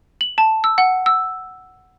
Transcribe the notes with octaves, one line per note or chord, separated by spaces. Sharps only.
F#7
A5
E6
F#5
E6